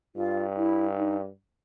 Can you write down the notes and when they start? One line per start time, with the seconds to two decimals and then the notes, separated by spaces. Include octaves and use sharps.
0.15 G2 F4
0.56 E4
0.97 D#4